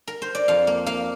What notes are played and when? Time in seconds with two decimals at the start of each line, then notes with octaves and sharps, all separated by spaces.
0.07 A#4
0.22 C5
0.35 D5
0.48 F2 F5
0.67 A#3
0.86 A#3 F5